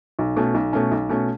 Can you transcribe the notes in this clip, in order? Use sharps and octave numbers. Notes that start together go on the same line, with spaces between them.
B1
B2 A3 C#4
B1
B2 A3 C#4
B1
B2 A3 C#4